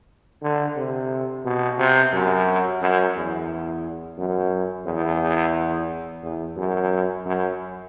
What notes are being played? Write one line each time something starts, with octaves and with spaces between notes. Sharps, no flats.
D3
C3
B2
C3
F#2
F#2
E2
F#2
E2
E2
F#2
F#2